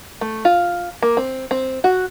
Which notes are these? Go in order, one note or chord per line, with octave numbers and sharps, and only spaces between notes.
A3
F4
A#3
C4
C4
F#4